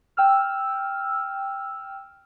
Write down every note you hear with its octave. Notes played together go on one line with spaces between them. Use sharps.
G5 E6 F6